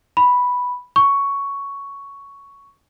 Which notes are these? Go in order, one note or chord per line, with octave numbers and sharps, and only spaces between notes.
B5
C#6